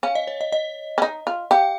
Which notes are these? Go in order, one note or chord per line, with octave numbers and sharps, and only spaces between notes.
C#4 F5
D#5
C#5
D#5
D#5
C#4
D#4
F4
G4 F5